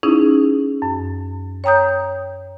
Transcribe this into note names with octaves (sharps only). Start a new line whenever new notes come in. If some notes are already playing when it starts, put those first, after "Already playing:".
C#4 D#4 E4 G#4
F#2
C#5 G5 A#5 D#6 G6